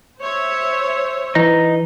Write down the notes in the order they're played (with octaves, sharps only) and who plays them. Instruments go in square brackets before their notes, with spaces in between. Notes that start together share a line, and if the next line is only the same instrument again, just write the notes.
[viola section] C5 C#5 E5
[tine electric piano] E3 [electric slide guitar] D#4